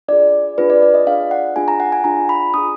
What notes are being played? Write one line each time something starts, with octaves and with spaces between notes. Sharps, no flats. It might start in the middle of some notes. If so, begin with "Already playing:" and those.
D4 F4 G#4 D5
D4 F4 G#4 B4
D5
D5
D#5
D4 F4 G#4 F5
F#5
D4 F4 G#4 G#5
A#5
F#5
G#5
D4 F4 G#4 A#5
B5
D4 F4 G#4 D#6